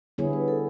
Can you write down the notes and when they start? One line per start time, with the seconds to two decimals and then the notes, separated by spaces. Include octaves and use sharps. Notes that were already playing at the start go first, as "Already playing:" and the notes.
0.18 D3 G3 B3 E4 G#4 C#5
0.33 B4
0.48 A4